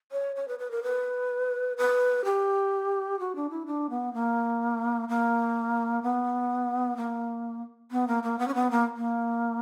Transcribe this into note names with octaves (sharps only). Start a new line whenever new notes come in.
C#5
C#5
B4
B4
A#4
B4
B4
G4
F#4
D4
E4
D4
B3
A#3
A#3
B3
A#3
B3
A#3
A#3
B3
C#4
B3
A#3
A#3